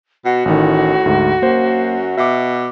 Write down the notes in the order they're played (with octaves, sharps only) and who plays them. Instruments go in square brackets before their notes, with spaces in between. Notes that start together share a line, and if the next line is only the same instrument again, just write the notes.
[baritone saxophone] B2 [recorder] F#4
[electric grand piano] A1 D#3 [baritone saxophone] A2
[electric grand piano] D2 G#2
[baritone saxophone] F#2 [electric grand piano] A#3 C5
[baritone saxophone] B2 [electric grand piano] E5 D6